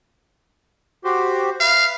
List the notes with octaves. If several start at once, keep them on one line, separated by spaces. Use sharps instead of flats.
F#4 G4 C5
B4 E5 F5